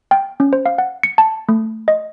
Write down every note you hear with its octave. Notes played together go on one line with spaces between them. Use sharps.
G5
C#4
C5
F5
F#5
C#7
A5
A3
D#5